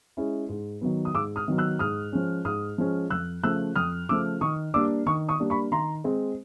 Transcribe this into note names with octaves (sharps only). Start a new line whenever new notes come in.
G#3 C#4 E4
G#2
D#3 F#3 B3
D#6
G#2 D6 E6
D#6 F6
D#3 F#3 B3
E6 F#6
G#2 D#6 F6
F3 G#3 C#4
G#2 D#6 F6
F3 G#3 C#4
F2 E6 F#6
C#3 F3 A3 E6 F#6
F2 D#6 F6
C#3 F3 A3 D6 E6
D#3 C#6 D#6
G3 A#3 D4 D6 E6
D#3 C#6 D#6
C#6 D#6
G3 A#3 D4
B5 C#6
D#3 A#5 C6
G#3 C4